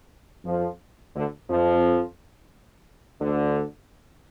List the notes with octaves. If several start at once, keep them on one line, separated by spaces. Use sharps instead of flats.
F2 F3
D2 D3
F2 F3
D2 D3